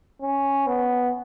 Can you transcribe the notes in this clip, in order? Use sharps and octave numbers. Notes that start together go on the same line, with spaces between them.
C#4
B3